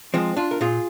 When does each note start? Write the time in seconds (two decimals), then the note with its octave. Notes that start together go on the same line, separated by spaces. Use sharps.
0.14 F3 G#3 C4
0.36 D4 F4
0.51 A#4
0.61 A#2 F4 G#4